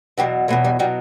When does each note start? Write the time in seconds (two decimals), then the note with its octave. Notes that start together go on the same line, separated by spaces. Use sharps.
0.18 E2 B2 F#3 G4
0.48 E2 B2 F#3 A3
0.64 G3
0.79 B2 F#3 G3